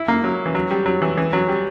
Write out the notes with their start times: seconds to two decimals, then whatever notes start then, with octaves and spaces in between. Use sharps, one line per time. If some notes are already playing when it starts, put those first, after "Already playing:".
Already playing: E4
0.08 A#3
0.24 F#3
0.46 E3
0.55 F#3
0.71 G3
0.86 F#3
1.02 E3
1.18 E3
1.33 F#3
1.49 G3